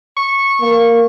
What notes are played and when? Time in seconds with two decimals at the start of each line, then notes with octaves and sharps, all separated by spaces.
0.17 C#6
0.61 A#3